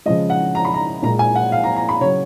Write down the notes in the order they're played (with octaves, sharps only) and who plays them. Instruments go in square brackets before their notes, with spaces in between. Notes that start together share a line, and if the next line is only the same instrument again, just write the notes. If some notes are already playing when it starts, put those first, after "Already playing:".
[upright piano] C#3 F3 G#3 D#5
F#5
A#5
B5
A#5
A#2 G#3 A#5
G#5
F#5
F5
A#5
A#5
B5
C#3 F#3 C#5